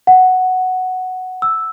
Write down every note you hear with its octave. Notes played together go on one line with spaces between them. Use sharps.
F#5
E6